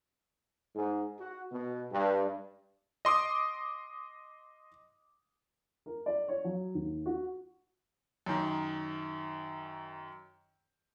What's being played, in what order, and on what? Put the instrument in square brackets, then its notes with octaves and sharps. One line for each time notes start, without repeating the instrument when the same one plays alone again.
[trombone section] G#2
F#4
B2
G2
[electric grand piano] D#5 C6 D6 D#6
[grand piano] A#4
D5
C#5
F#3
D#2
F#4
[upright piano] F#2 D#3